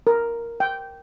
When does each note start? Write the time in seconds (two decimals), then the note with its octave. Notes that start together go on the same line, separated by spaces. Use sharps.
0.07 A#4
0.60 G5